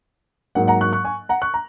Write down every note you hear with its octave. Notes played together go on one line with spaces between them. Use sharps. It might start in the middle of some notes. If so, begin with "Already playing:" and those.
G#2 F#3 A#3 F#5
F#5 A#5
C#6 F#6
C#6 F#6
G#5 C#6
F#5 A#5
C#6 F#6
A#5